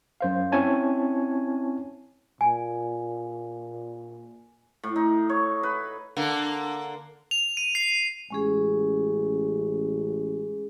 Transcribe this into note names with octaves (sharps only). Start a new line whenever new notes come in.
F#2 C5 F5
C4 C#4 E4 C#5 G#5 A5
A#2 G#5
A2
D#4
C#5
B4
D3 A#3
F7
D#7
C7
A1 G#3 C#4 G#4